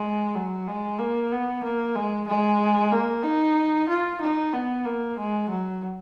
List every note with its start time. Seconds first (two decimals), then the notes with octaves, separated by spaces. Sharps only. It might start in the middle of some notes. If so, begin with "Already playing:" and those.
Already playing: G#3
0.35 F#3
0.67 G#3
0.99 A#3
1.32 B3
1.63 A#3
1.95 G#3
2.28 G#3
2.92 A#3
3.24 D#4
3.89 F4
4.21 D#4
4.53 B3
4.85 A#3
5.18 G#3
5.50 F#3